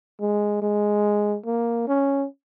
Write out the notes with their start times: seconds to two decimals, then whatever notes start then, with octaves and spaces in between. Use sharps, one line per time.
0.21 G#3
0.62 G#3
1.46 A#3
1.88 C#4